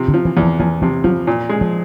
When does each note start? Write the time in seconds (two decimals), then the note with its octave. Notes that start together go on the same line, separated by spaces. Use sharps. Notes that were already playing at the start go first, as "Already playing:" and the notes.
Already playing: C3 F3
0.08 D3
0.14 F3
0.25 E3
0.37 E2
0.42 F3
0.60 E2 F3
0.82 C3 F3
1.04 F3 F#3
1.27 A#2
1.49 G#3
1.61 F3